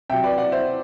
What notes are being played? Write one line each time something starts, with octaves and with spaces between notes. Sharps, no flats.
C3 F#3 E5 G5
B4 D5
D5 F#5
C5 E5